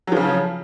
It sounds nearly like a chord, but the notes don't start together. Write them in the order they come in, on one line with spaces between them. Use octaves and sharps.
F#3 F3 C#3